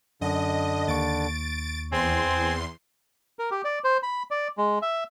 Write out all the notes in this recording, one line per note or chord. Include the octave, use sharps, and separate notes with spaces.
F#2 D3 D#5
D#2 C#6 A6 D7
E2 C4 G#5 C6
A#4
G4
D5
C5
B5
D5
G#3
E5